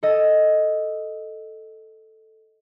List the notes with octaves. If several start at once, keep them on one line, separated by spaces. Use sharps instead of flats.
A4 D#5